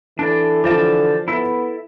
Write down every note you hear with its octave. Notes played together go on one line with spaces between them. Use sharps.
E3 D4 A4 D5
D3 F3 F4 G4 D5 A5
B3 E4 A4 E5